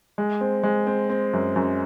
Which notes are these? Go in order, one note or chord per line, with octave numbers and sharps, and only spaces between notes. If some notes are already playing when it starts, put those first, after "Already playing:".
G#3
C4
G#3
C4
C4
F#2
F#2